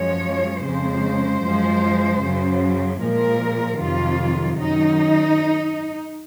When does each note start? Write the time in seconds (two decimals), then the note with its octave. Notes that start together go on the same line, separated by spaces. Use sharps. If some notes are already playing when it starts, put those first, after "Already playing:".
Already playing: F#2 F3 G#3 C#5
0.65 F2 C#3 G#3 C5
1.43 F#2 F3 G#3
2.22 F#2 C#3 F#3
3.00 A#2 F3 G#3 A#4
3.79 F2 C3 D#3 F#3 F4
4.57 F#2 D#3 F#3 D#4